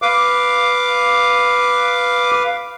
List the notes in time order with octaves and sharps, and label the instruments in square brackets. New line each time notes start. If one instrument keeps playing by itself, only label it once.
[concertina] B4 F5 [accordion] D6